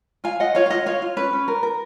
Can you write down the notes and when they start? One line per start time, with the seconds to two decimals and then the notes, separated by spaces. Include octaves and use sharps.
0.24 F4 F5 G#5
0.40 F4 D#5 F#5
0.55 F4 C#5 F5
0.66 F5
0.70 F4 D#5 F#5
0.86 F4 C#5 F5
1.02 F4
1.17 C#4 B4
1.33 C#4
1.48 A#4
1.63 A#4